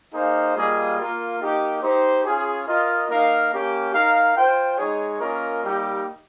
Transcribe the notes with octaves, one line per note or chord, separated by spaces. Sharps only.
A#3 D#4 G#4 C5 F5
G3 A#3 F4 G#4 D#5
A#3 F4 A#4
A#3 D#4 G4
D#4 G4 C5
C#4 F4 G#4
F4 A#4 D#5
A#3 D#4 A#4 F5
A#3 C#4 G4
D#4 A#4 F5
F4 C5 G5
G#3 D#4 G#4 C#5
A#3 C#4 F4 A#4 D#5
G3 A#3 D#4 G4